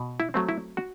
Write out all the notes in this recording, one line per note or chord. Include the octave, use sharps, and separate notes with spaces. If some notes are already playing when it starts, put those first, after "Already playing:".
Already playing: B2
E4
F#3 A3 C4
E4
F#4